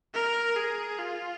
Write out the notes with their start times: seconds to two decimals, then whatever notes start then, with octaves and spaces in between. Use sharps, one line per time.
0.15 A#4
0.56 G#4
0.98 F4